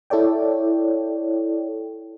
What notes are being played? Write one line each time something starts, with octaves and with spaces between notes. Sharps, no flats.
E4 A4 C#5 D5 G5